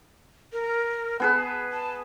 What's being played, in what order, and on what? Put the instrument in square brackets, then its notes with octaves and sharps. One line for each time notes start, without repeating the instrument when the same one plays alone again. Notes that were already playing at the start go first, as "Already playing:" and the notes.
[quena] A#4
[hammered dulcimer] B3 G#4 B4 [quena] A5
[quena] A5